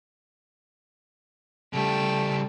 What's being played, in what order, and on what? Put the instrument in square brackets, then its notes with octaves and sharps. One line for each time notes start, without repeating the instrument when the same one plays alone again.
[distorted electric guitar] C#3 G3 [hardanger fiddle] A3 G5